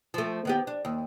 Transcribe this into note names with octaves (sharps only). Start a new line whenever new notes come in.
F3 A3
D#3 B3 G4
D4
D#2